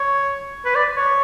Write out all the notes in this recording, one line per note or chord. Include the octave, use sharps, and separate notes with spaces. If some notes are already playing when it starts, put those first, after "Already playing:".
Already playing: C#5
B4
D5
C#5